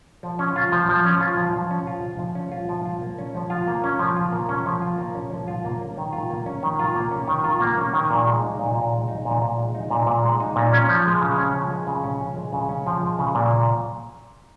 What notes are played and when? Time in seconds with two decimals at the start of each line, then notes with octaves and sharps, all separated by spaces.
0.23 F3
0.39 C#4
0.56 F4
0.72 F3
0.89 F3
1.05 C#4
1.21 F4
1.37 F3
1.53 F3
1.71 C#4
1.87 F4
2.02 F3
2.19 F3
2.35 C#4
2.52 F4
2.69 F3
2.85 F4
3.01 A#3
3.18 C#4
3.35 F3
3.50 F4
3.67 A#3
3.84 C#4
3.99 F3
4.17 F4
4.33 A#3
4.49 C#4
4.66 F3
4.82 F4
4.98 A#3
5.15 C#4
5.31 F3
5.48 F4
5.65 A#3
5.81 C#4
5.97 D#3
6.13 F4
6.30 A#3
6.46 C#4
6.63 D#3
6.79 F4
6.95 A#3
7.11 C#4
7.27 D#3
7.44 F4
7.61 A#3
7.77 C#4
7.93 D#3
8.11 A#2
8.27 G#3
8.42 D#4
8.59 A#2
8.75 A#2
8.92 G#3
9.08 D#4
9.25 A#2
9.42 A#2
9.57 G#3
9.75 D#4
9.90 A#2
10.06 A#2
10.23 G#3
10.40 D#4
10.56 A#2
10.73 C#4
10.89 F3
11.06 G#3
11.21 C#3
11.38 C#4
11.54 F3
11.70 G#3
11.87 C#3
12.04 C#4
12.21 F3
12.36 G#3
12.53 C#3
12.69 C#4
12.86 F3
13.02 G#3
13.19 C#3
13.35 A#2